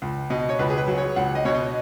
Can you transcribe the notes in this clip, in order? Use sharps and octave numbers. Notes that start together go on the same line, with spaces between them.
C#2
B2 D#5
C#5
C#2 B4
G#4
B4
F#3
C#5
C#2 F#5
D#5
B2 C#5
D#5